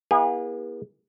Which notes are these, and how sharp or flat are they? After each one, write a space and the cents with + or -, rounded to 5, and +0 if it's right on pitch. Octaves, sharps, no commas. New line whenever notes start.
B3 -45 E4 -5 G#4 -35